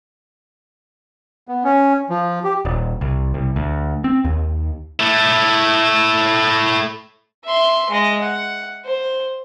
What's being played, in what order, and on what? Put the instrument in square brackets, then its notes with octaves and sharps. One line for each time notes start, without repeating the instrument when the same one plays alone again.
[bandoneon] B3
C#4
F3
G4
[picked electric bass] D#1
C2
C2
D2
C4
D#2
[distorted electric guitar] A3 E4
[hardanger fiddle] E5 C6
G#3 D#5
F#5
C5